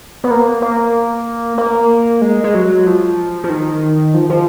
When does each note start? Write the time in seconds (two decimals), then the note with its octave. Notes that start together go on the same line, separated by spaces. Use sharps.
0.24 B3
0.31 A#3
0.62 A#3
1.58 A#3
2.22 G#3
2.44 G#3
2.55 F#3
2.87 F3
3.44 F3
3.50 D#3
4.14 F3
4.30 F3